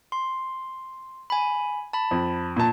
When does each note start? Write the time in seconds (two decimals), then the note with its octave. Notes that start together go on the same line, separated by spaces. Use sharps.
0.12 C6
1.30 G#5 B5
1.93 A5 B5
2.11 F2
2.56 A#2 A5